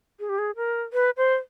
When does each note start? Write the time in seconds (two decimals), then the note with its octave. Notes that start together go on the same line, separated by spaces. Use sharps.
0.20 G#4
0.29 G4
0.38 G#4
0.56 A#4
0.93 B4
1.17 C5